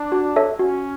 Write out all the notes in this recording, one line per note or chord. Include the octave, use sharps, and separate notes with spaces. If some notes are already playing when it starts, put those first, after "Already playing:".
Already playing: D4
F#4
A4 C#5 E5 A5
C#4 F#4